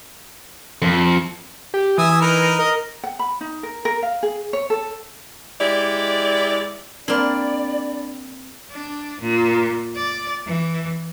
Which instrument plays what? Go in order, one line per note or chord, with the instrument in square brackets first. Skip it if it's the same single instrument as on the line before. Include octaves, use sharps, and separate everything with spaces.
[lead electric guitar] F2
[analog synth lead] G4
[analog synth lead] E3 [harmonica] E5 G#5 D#6
[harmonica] D#4 A#4 B4
[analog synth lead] A#4 [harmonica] D#5
[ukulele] F#5
B5
D#4
A#4
A#4
F5
G#4
C#5
A4
[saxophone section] G#3 E4 G4 D5
[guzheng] A#3 C4 [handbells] D4 B5 [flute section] D5
[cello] D4
A#2
D5
E3